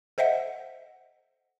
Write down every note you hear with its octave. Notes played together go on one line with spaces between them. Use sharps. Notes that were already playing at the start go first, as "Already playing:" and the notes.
A4 C5 D#5 E5 F#5